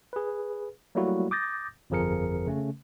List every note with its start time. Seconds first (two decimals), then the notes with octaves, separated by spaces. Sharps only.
0.13 G#4 B4
0.95 F#3 G3 A3 A#3 E4 F#4
1.31 D6 D#6 G6 A6 A#6
1.90 G1 F2 F3 G#4 A#4 C#7
2.47 C#3 A3 C#4